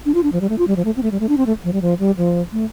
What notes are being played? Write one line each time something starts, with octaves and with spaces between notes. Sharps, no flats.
D4
F4
D4
F3
G3
A3
F4
G3
F3
A3
C4
A3
G3
A3
D4
C4
A3
F3
G3
F3
G3
F3
A3